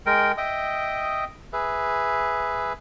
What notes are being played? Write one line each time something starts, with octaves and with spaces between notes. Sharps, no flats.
G#3 A#4 G5
D#5 E5 G5 D#6
G#4 B4 E5